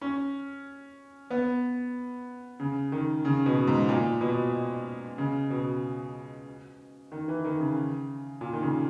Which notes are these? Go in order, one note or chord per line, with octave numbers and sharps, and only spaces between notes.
C#4
B3
C#3
D#3
C#3
B2
G#2
A#2
B2
C#3
B2
D#3
E3
D#3
C#3
A#2
D#3
C#3